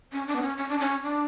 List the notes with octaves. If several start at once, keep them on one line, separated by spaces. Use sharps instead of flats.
C#4
D4
B3
C#4
C#4
D4
C#4
D4